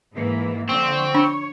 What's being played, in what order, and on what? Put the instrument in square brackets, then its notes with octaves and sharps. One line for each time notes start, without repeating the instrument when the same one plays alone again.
[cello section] G#2 E3 A#3
[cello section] D3 F3 [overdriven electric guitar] C4 [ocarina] C#6
[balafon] D4 [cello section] C#5